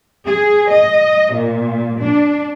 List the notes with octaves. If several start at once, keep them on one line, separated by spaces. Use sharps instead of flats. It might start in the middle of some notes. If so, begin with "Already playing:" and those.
G#4
D#5
A#2
D4